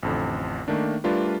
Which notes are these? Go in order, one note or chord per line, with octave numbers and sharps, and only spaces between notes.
A1 F2 D3
D#3 A3 A#3 D4
G3 A3 D4 F4 A#4 B4